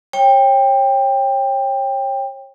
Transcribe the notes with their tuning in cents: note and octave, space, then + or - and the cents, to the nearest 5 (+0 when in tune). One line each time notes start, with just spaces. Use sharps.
C#5 -30 G5 +15